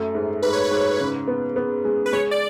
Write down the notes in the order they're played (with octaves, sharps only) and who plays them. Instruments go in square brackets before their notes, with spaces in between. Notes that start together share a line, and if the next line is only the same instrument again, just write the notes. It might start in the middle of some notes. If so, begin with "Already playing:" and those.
Already playing: [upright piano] F#2 A3
G#2
[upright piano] G#2 [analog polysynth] B4
[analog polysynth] C#5
B4
[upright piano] G#2
C#3
B3
B3
G#3
[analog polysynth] B4
[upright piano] G#3 [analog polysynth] C#5
[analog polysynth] D5